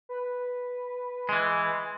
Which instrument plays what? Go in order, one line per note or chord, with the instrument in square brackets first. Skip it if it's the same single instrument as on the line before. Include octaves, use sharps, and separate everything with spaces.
[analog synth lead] B4
[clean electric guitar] E3 G#3